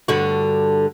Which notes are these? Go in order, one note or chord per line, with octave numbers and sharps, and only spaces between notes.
G2 D3 F#4